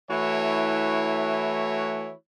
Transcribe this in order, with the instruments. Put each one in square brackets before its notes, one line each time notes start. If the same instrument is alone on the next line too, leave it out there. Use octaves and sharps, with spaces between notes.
[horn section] E3 A3 E4 F#4 C#5